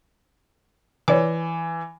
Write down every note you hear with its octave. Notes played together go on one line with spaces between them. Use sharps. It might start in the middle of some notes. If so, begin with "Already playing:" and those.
E3 C#5 D5 D6